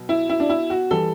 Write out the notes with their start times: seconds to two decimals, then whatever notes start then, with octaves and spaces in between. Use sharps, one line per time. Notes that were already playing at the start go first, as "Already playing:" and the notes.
Already playing: B2 F#3
0.09 E4
0.29 E4
0.40 D4
0.50 E4
0.70 F#4
0.91 E3 G3 A4